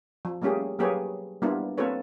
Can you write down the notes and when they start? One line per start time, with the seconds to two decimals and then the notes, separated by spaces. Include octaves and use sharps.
0.25 F3
0.42 G3 A3 A#3 C#4 G4 G#4
0.79 F#3 A#3 G4 G#4 B4 C#5
1.42 G3 A#3 B3 D4 E4 F4
1.78 A#3 C4 F4 A4 B4 C#5